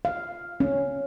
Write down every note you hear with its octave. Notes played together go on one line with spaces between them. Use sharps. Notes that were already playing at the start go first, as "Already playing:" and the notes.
F5
C#4